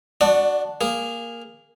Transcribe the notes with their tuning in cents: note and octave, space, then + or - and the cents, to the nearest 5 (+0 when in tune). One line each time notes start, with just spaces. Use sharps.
D4 +0 F#4 +0 D5 +35
A#3 +0 G#4 -20